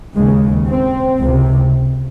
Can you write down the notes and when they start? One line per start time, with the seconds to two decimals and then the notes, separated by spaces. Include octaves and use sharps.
0.15 D#2 C#3 G#3
0.67 C4
1.19 C#2 C3